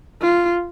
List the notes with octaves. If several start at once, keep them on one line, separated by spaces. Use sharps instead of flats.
F4